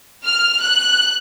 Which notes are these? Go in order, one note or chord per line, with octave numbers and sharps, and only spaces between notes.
F6
F#6